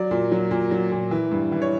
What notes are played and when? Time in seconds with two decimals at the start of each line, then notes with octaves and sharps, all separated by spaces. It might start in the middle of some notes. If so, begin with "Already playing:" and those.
Already playing: F#3 D5
0.11 A#2
0.32 F#3
0.51 A#2
0.71 F#3
0.91 A#2
1.11 E3
1.31 G2
1.52 E3
1.62 C#5